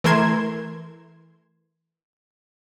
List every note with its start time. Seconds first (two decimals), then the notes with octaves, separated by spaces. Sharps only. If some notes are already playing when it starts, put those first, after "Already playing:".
0.04 E3 A3 A#4 C6 G#6 E7